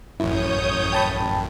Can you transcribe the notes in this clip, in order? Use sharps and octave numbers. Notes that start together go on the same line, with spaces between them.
A1 F#2 E4 C#5 D#6 G6
G5 A5 B5